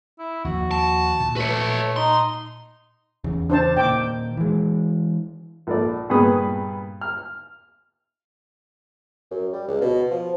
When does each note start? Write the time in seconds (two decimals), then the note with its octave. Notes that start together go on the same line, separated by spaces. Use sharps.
0.19 E4
0.45 D#2 F3 F#4
0.71 A5
1.20 A#2
1.36 A3 B4 C#5
1.96 D#4 C6
3.24 E2 C#3
3.50 D4 C5 A5
3.77 A#2 D#3 G5 D6
4.37 E3 G#3
5.67 A#1 A4 D5
6.10 G2 A#2 B3 G#4 B4 D#6
7.01 F6
9.31 F#2
9.53 G3
9.68 C#2
9.81 B2
10.11 F3